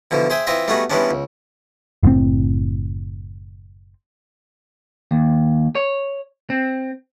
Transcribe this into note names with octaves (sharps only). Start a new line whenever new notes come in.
B2 D3 E3 F3
G#4 C5 E5 G5 G#5
E3 C4 F4 D#5 E5
G3 A3 B3 D#4 F#4 G#4
E3 G3 G#3 B3 C#4 D4
C#2
F#1 A2 C3 C4
D#2
C#5
C4